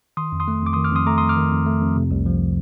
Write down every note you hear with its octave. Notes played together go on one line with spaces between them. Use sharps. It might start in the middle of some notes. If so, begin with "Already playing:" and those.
D#3 C6 D#6
F2
C6 D#6
A3
F2 D6
D#3 C6 D#6
D6 F6
F2 C6 D#6
A3 A#5 D6
F2 C6 D#6
D6 F6
D#3
F2
A3
F2
C3
C2
F3